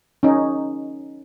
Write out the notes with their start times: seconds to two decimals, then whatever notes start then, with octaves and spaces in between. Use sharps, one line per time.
0.23 C#4 D#4